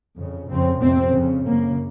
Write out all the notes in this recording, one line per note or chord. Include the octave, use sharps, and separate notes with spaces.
F2 C#3
F2 C#3 C4
F2 C3 C4
F2 C#3
F#2 C#3 A#3